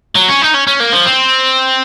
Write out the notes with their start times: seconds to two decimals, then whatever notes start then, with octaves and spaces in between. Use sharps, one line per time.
0.16 F#3
0.29 C#4
0.42 D#4
0.55 C#4
0.67 C#4
0.80 A#3
0.93 F3
1.06 C4